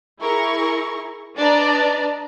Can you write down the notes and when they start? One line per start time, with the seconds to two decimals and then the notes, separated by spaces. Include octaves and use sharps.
0.20 E4 G#4 A#4 C#6
1.38 D4 B4 D5 D#5 A5 A#5